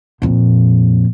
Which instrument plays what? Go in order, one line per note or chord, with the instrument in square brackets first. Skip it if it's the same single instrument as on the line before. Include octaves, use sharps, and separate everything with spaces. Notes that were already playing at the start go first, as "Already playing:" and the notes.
[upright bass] F2 A#2